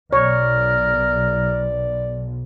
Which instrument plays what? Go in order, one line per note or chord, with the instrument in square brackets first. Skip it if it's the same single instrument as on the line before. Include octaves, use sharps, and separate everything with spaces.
[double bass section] B1 [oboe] A#4 [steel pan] C#5 [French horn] D5